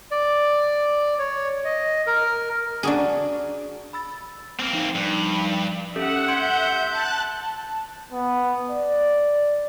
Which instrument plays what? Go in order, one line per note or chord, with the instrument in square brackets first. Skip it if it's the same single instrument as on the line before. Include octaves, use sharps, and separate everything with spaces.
[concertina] D5
C#5
D#5
A#4
[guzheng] D4 F#4 G#4
[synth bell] B5 E6 A6
[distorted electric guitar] A#3 C4 [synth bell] G5
[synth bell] F3 D#4
[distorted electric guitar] G2
[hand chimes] C#4 G4 A4 [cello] E5 [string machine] F#5
[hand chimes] C6 G#6 D7 [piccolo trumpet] G6
[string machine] A5 F#6
[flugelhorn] A5
B3
D5